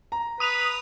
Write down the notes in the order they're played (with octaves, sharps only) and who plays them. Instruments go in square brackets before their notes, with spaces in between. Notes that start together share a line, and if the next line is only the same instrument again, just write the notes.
[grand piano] A#5
[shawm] B4 [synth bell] D#6 F7